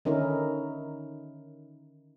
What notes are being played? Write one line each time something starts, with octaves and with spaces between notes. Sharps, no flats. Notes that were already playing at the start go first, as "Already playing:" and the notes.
D3 D#3 C#4 D#4 E4 A#4